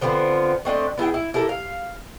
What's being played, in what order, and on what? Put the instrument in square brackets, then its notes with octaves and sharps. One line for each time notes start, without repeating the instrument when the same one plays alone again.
[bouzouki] D3 F3 B3 C4
A3 C4 D4 D#5
B3 E4 G#4 G5
E4
E4 G4 A4 A#4
F5